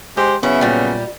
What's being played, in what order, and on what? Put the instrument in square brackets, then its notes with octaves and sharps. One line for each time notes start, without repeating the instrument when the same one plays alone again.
[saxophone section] G#3 G4 [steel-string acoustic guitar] C5
[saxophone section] C#3 F#3 B3 [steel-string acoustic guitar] E4
[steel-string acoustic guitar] A#2 G3